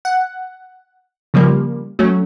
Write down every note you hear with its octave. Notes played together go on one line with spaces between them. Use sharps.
F#5
C#3 F3 G3 A#3
F#3 A3 C#4